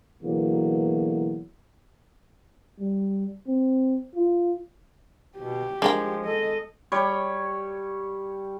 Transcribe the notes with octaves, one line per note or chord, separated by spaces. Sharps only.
E2 B2 D3 E3 F#3 A#3
G3
C4
F4
B2 G4
F3 G#3 D4 A#4 G5
A4 D#5
G3 C#5